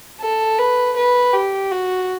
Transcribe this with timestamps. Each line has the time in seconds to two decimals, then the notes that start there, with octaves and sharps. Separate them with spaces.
0.21 A4
0.58 B4
0.96 B4
1.33 G4
1.71 F#4